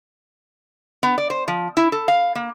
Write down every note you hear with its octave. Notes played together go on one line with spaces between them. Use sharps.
B3
D5
C5
F3
E4
A4
F5
A#3